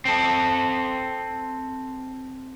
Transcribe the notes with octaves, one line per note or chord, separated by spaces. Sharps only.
C4 A4